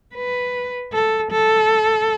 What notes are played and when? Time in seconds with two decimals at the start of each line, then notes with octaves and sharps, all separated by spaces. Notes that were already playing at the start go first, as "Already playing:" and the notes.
0.14 B4
0.93 A4
1.31 A4